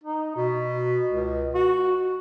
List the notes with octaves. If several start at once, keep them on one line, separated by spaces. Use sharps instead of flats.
D#4
B2
C#2
F#4